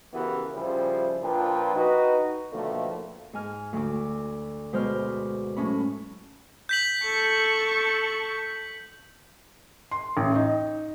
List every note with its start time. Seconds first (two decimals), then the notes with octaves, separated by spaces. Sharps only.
0.14 C#3 E3 B3 F#4 G4 A#4
0.54 C#3 F3 G3 E4 C5
1.23 A#2 F3 D4 B4 G5
1.75 D#4 F#4 B4
2.52 B2 D3 D#3 F3 A3 A#3
3.33 G#2 G#5 F6
3.73 D2 D6
4.73 B2 G#3 C5 B5 D6 F6
5.56 F#2 A2 C#4 B5
6.69 G6 B6 F#7
7.03 A4 C#6
9.91 C6
10.17 A1
10.35 D#4